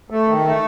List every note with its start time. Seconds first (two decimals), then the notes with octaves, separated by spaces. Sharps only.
0.10 A3
0.28 D#3
0.45 A3